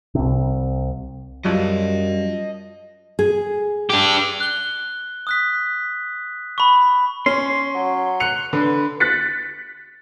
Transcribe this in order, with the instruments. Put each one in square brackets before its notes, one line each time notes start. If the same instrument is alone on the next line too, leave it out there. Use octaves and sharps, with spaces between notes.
[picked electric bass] C2 C3
[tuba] F#2 [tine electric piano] F#3 G3 F4 [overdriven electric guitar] D#5 A5
[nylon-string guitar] G#4
[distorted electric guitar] D4 G4
[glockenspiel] F#6 G7
D#6 F#6 B6
B5 C#6
[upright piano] C#4 [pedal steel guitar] C6
[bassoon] F#3
[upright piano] F#6 C#7 F7
[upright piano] D3 [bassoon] B4
[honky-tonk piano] F#6 A6 B6 C#7